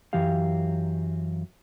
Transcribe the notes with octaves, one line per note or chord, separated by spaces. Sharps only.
F#2 E3 F#3 G4 F5